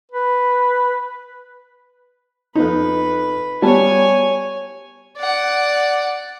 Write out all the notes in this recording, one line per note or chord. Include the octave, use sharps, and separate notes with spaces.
B4
F2 D#4 B4
G3 B3 C#5 G#5 A5
D5 F#5